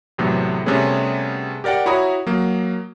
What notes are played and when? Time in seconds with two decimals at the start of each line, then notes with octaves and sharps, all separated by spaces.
0.18 E2 A2 C3 F#3 A3 B3
0.66 C3 G3 A3 B3 C#4 G#4
1.64 G4 A#4 D5 F#5 G5
1.86 E4 F#4 C#5 A#5 B5 D#6
2.27 F#3 A#3